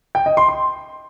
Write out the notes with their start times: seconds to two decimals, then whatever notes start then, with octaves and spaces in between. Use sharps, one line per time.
0.15 G5
0.26 D#5
0.37 C6
0.48 C6